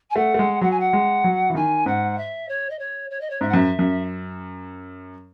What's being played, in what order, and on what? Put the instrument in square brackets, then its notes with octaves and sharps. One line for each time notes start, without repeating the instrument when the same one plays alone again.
[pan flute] G#5
[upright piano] A3 [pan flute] F#5
[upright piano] A3
G#3
[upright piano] F#3 [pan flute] F#5
[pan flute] G#5
F#5
[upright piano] G#3
F#3
E3
[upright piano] D#3 [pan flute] G#5
[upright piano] G#2 [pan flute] F#5
[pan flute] E5
C#5
D#5
C#5
C#5
D#5
C#5
[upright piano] G#2 [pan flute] E5
[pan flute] F#5
[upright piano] F#2 [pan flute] E5
[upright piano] F#2